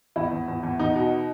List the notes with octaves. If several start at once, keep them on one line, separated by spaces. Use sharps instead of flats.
E2 E4
E2
E2
E2
E2 D#4
B2